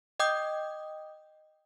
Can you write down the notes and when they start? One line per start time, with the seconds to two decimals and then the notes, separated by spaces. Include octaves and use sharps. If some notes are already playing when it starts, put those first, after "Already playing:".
0.20 D#5 G5 D6 D#6 G6